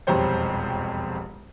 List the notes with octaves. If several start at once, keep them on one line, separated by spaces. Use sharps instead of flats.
E1 C2 F2 G4 C5 C#5